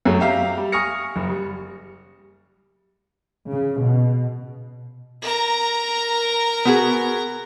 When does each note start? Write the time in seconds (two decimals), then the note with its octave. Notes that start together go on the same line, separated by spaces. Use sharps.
0.05 F#2 F#3 A3
0.20 G4 E5 F5 A#5
0.57 G3
0.72 G#5 C#6 D#6 F6 A#6 C#7
1.16 F#1
1.29 G3
3.51 C#3
3.81 B2
5.22 A#4 A#5
6.65 B3 F#4 G#4